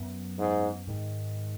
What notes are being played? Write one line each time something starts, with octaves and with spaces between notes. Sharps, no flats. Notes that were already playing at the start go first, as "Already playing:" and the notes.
Already playing: F#2 F#3 B3
G#2
G#2 D#3 G#3